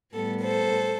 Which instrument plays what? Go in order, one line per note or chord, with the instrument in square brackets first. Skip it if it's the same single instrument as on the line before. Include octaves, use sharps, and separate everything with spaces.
[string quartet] A2 G3 B3 A4
A4 C5